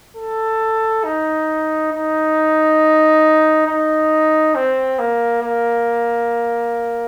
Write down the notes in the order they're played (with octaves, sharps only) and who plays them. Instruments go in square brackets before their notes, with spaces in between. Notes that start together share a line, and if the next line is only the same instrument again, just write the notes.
[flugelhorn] A4
D#4
D#4
D#4
C4
A#3
A#3